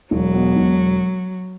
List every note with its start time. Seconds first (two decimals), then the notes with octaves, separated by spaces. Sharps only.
0.11 E1 F#3
0.34 B2
0.56 E1